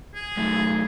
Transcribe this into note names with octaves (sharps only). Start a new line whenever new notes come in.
G#4
F#2 A3